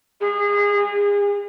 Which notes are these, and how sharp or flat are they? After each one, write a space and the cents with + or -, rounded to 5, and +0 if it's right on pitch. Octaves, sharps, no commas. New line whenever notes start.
G#4 -25
G#4 -35